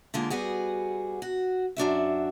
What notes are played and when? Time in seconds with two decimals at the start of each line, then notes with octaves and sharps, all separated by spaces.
0.14 D3 G#3 A#3 F4
0.30 G3 B3 F#4 G#4
1.22 F#4
1.77 F#2 D4 F#4 E5